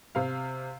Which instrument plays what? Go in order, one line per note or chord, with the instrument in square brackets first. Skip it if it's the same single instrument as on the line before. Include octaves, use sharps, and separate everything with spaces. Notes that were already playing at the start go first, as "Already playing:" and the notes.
[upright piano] C3 F5